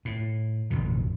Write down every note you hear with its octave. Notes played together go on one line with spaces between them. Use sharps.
A2
A1 F2 B2 D3